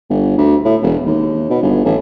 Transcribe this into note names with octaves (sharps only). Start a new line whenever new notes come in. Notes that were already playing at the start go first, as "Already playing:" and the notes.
G1
D2
A2
E1
D#2
B2
G1
A1